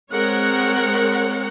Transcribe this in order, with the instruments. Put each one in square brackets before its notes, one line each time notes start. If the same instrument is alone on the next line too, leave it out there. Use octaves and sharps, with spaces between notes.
[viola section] G#3 C4 A#4 C#5 F#5